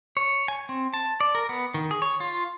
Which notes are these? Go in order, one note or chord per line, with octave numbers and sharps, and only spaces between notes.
C#5
G#5
C4
A5
D5
A#4
B3
D#3
G#4
C#5
F4